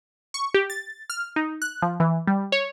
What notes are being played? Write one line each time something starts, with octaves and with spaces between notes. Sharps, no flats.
C#6
G4
A6
F6
D#4
F#6
F3
E3
G3
C#5